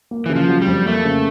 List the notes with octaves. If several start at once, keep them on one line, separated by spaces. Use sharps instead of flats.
A#3
C#3 E3
F3
F#3
G3
F2
A3 A#3
C#3